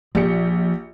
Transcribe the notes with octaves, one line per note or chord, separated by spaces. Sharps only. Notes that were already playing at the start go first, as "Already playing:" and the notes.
A#1 F3 G4 C#7